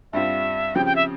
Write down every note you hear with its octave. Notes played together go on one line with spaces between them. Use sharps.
G2 G3 C4 F4 E5
C#3 F3 C4 G4 G5
G5
E5